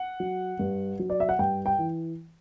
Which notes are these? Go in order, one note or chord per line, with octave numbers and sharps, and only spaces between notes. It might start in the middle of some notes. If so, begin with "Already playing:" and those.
Already playing: F#5
F#3
G2
F#3
D5
E5
F#5
G2 G5
G5
E3